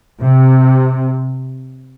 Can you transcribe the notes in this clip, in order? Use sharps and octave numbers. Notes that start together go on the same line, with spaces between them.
C3